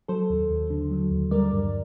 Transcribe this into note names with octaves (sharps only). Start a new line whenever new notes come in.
F#3 A4 C5
D#2
D#2
D3
F#3
D#2
G3 A#4 D5
G2